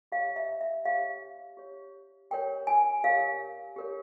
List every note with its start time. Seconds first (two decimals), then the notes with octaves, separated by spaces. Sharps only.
0.12 G4 C#5 F5
0.36 E5
0.61 E5
0.85 G4 C#5 F5
1.57 G4 C#5
2.31 G4 A#4 C#5 G5
2.67 G#5
3.04 G4 A#4 C#5 F5
3.76 G4 A#4 C#5